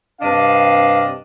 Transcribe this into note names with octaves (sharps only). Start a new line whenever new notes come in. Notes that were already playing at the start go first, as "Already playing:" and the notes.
G2 C3 D4 D#5 F5 A5